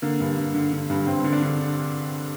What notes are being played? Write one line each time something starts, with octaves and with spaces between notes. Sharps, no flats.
D3 A#3
G2
G2
D3
D3
G2
G2 C4
D3
D4
D3